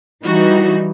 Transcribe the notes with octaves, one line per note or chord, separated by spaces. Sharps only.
E3 G3 D#4 F#4